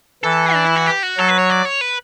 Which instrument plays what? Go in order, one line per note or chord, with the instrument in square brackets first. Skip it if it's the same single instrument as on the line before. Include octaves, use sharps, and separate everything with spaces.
[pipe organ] E3 [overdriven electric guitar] A4
[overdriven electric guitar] D4
E4
F#4
G4
F#4
[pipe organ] F#3 [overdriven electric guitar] A4
[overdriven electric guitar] B4
C#5
D5
C#5
B4